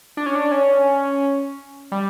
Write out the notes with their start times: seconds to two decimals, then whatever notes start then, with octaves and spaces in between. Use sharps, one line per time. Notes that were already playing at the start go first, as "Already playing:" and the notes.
0.17 D4
0.26 C#4
0.35 D4
0.52 C#4
1.92 G3